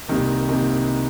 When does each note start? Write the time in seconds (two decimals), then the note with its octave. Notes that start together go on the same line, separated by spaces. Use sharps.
0.08 C2 C3 D#3 A#3
0.48 C3 D#3 A#3